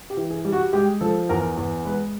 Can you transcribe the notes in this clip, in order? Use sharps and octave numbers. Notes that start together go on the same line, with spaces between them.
G4
E3
G#4
G3
F#4
G#3 G4
F3 A4
E2 A#4
E2
G#3 B4